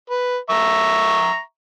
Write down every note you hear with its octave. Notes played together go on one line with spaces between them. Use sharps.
B4
E5 A#5 C#6